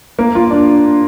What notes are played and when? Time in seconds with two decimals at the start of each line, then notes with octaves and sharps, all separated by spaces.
0.19 A#3
0.35 F4
0.51 D4